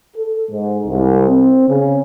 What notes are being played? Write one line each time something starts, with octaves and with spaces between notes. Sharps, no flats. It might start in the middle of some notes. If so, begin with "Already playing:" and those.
A4
G#2
C2
C4
C#3